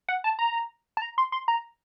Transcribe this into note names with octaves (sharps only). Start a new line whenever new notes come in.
F#5
A5
A#5
A5
A#5
C6
C6
A#5